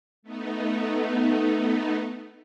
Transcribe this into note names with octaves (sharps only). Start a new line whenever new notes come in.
A3 B3 D#4